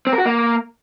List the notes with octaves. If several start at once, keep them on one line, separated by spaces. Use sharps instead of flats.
C4
A#4
F#4
A#3